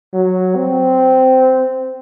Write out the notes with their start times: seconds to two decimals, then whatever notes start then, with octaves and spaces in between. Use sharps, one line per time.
0.13 F#3
0.56 C4